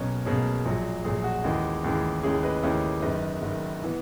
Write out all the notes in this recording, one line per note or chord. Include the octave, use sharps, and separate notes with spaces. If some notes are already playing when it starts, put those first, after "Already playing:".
Already playing: B1 B2 A#3 C#4 A#4
B1 B2 A#3 C#4 G#4
A#1 A#2 F#3
A#1 A#2 F#3 G#4
F#4
D#2 C#3 E3 G#3
D#2 C#3 E3 G#3
D#2 C#3 G#3 C#4 E4 G#4
B4 D#5
D#2 C#3 G#3 C#4 E4
F#1 F#2 D#3 B4 D#5
F#1 F#2 D#3
E3 B3